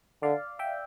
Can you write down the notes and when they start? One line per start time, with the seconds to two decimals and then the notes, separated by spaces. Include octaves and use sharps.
0.22 D3 D5 F5
0.59 E5 G5